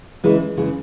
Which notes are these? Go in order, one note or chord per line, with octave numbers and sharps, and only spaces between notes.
C#3 E3 G#3
C#3 E3 G#3